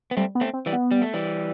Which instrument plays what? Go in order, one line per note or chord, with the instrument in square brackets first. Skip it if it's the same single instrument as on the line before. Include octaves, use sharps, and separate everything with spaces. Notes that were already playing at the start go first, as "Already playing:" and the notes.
[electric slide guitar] B3
[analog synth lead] G3 [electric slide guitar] A3 C4
[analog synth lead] B3
[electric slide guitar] A3 C4
[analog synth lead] C4
[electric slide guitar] E3 G3
[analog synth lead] B3
[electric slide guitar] G3
A3
E3 G3